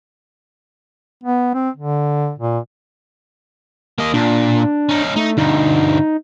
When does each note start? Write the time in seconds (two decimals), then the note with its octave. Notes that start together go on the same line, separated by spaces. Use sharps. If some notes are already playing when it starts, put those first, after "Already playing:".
1.24 B3
1.54 C4
1.77 D3
2.39 A#2
3.98 A#3 D#5
4.14 A#2 D4
4.89 C#4 D#4
5.16 A3 D#4
5.38 D2 G2 D#4